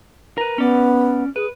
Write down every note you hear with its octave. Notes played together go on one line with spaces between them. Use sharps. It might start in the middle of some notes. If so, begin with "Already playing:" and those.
A#4 B4
B3 C#4 D5
G#4 B4